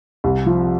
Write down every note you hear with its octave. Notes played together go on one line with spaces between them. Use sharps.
C2
F3